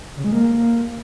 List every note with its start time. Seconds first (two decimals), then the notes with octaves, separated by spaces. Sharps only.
0.16 C#3
0.24 G#3
0.32 A#3